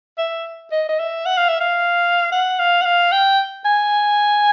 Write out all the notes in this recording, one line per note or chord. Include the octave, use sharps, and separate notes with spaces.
E5
D#5
D#5
E5
F#5
F5
E5
F5
F#5
F5
F#5
F5
G5
G#5